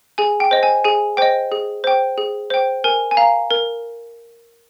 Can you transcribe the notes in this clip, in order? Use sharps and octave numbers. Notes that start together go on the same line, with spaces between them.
G#4 G#5
G5
C5 D#5
G#5
G#4 G#5
C5 D#5 G5
G#4
C5 G5
G#4
C5 G5
A#4 G#5
G#5
F5 A#5
A#4